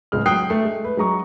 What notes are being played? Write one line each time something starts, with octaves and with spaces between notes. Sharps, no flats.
D1 C#2 G#3 F6
F#3 G5 D#6 F#6 C7
A3
G#3
B4
F#3 G#3 A#5 C#6